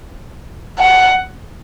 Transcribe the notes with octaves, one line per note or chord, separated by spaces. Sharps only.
F#5